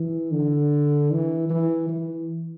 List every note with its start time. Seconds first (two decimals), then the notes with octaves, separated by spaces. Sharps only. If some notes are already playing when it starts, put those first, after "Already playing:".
Already playing: E3
0.32 D3
1.11 E3
1.50 E3
1.89 E3